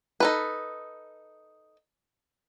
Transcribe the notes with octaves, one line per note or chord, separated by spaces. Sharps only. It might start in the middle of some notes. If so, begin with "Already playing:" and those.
D#4 A4 B4